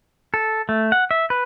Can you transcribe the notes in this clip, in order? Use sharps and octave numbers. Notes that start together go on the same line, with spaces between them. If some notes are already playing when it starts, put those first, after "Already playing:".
A4
A3
F#5
E5
B4